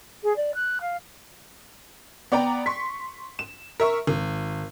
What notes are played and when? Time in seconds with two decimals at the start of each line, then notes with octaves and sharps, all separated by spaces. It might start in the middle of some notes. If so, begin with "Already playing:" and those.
0.23 G#4
0.36 D5
0.54 F#6
0.80 F5
2.32 B3 D5 G5 A#5
2.66 C6 C#6 B6
3.39 E7
3.80 A#4 E5 C#6
4.07 G#1